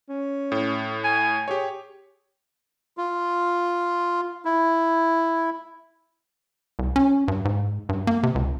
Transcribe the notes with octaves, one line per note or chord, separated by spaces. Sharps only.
C#4
A2
G#5
G4 G#4 C#5
F4
E4
C2
C#4
G2
G#2
G2
A#3
C3
C#2